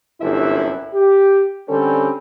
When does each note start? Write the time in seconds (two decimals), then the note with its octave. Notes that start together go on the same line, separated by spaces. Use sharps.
0.21 G1 C2 F#2 E4 E5
0.93 G4
1.69 D3 G3 C4 C#4 A4